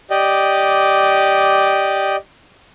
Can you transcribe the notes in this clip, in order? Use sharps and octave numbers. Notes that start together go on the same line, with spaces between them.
G4 D5 D#5